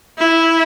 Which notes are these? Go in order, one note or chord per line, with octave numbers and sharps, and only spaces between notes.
E4